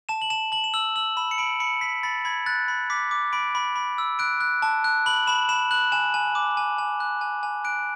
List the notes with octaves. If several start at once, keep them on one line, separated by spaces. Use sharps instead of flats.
A5 E7
F#7
A5 E7
A5 F#7
E7
E6 F#7
E6 F#7
B5 E7
C#7
B5 D7
B5 C#7
B5 B6
B5 A6
B5 G#6
F#6 A6
B5
D6 B6
D6
B5 D7
B5
B5
E6
F#6 D7
F#6
A5
F#6
B5 F#7
B5 E7
B5 E7
F#6 F#7
G#5 E7
G#5
D6
G#5
G#5
F#6
G#5
G#5
F#6 D7